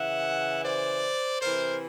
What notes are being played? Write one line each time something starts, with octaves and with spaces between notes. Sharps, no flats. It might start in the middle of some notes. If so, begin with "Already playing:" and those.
Already playing: C#3 E3 E5 F#5
C5 D5
C3 E3 A#4 C5